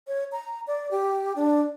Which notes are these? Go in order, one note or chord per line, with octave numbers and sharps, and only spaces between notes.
C#5
A#5
D5
G4
D4